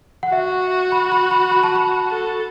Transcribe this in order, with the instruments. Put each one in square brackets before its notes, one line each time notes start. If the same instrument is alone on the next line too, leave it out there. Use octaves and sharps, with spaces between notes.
[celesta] F#5
[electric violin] F#4 [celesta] E5
[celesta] B5
B5
B5
B5
A5
B5
[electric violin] A4